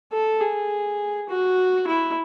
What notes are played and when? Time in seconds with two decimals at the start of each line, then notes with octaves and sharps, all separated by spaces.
0.12 A4
0.41 G#4
1.29 F#4
1.87 E4